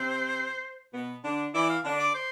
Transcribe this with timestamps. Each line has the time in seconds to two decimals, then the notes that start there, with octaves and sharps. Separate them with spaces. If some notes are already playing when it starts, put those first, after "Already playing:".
Already playing: C3 C4 C5
0.94 B2 B3
1.24 D3 D4
1.54 E3 E4 D5
1.69 F5
1.84 D3 D4
1.99 D5
2.15 C5